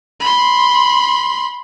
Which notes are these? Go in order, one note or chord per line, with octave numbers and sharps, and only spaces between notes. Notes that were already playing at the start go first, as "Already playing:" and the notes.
B5 C6